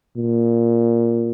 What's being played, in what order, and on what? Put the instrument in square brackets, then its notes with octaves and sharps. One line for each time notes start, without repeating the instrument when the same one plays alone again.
[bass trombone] A#2